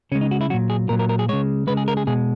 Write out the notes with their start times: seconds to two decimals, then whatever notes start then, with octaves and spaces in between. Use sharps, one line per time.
0.12 C#3 C#4
0.15 G#3
0.21 D#4
0.31 F#4
0.41 E4
0.50 A#2 F#3 F#4
0.70 G#4
0.89 A#2 F#3 A#4
0.99 A#4
1.09 A#4
1.19 G#4
1.29 C#3 G#3 C#5
1.67 C#3 G#3 B4
1.77 G#4
1.88 A#4
1.97 G#4
2.07 B2 G#3 G#4